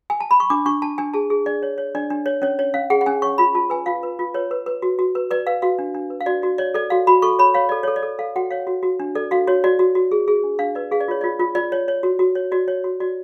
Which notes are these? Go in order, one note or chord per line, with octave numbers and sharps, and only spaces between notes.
G#5
A5
B5
C#6
D4 D6
D4 C#6
D4 A5
D4 G#5
G#4 A5
G#4
D4 D5
C#5
C#5
D4 D5
D4
C#5
C#4 C#5
C#5
C#4 F5
G#4 F#5
F#5
C#4 G#5
C#5 C#6
F4 B5
F4 A5
B4 G#5
F4 F5
B4
F4
B4 C#5
B4
B4
F#4
F#4
B4
B4 D5
B4 F5
F#4 F5
D4
D4
B4
F5
F#4 D5
F#4 D5
C#5 D5
A4 D5
F#4 F5
F#4 B5
A4 C#6
C#5 B5
C#5 F5
A4 D5
A4 C#5
D5
A4
A4 F5
F#4 F#5
C#5 F5
F#4
F#4
D4
A4 D5
F#4 F5
F#4 C#5
F#4 D5
F#4
F#4
G#4
G#4
D4
D4 F5
B4 D5
G#4 F5
D5
F4 C#5
F4 D5
F4
F4 D5
C#5
C#5
F#4
F#4
C#5
F#4 D5
C#5
F#4
F#4 D5